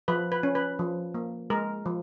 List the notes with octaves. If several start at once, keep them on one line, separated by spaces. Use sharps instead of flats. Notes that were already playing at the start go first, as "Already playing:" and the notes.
F3 B4
B4
C#4
B4
F3
A#3
G#3 A#4
F3